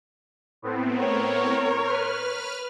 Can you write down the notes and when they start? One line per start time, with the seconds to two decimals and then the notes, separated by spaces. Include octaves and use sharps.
0.62 A2 B3 C4
0.97 A#4 C#5
1.85 B4 F6